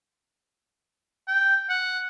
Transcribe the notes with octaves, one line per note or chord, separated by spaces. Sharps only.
G5
F#5